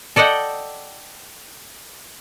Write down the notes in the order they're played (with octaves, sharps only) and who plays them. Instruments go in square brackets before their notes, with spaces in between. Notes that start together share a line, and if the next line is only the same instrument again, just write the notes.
[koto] A4 D5 D#5 F#5 G5